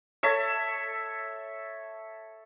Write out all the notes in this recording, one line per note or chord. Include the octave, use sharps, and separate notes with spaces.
A4 C#5 E5